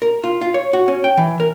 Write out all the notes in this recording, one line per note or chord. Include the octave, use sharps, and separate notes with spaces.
A#4
F4
F4
C#5
F#4
C#4
G5
E3
A#4